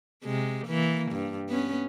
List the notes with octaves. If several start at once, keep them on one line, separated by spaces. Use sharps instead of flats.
C3 G#3
E3 A#3
G2
B3 C#4